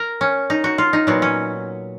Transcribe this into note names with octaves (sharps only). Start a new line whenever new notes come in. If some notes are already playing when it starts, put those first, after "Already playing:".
Already playing: A#4
C#4
D#4
F#4
F4
D#4
A#2 F#3 B3
C#4